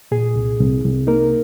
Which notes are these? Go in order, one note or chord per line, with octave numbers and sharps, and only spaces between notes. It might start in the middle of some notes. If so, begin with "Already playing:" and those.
A#2 G#4
C2
C2
C2
A#3 D#4 A#4